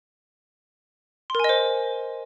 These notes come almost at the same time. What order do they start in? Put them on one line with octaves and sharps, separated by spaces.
C6 A#4 G#5 D#5 C5